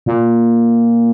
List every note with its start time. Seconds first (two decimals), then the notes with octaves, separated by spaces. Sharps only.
0.06 A#2